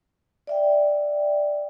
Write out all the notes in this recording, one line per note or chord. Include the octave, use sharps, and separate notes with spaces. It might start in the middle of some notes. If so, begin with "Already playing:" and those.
D5 E5 G5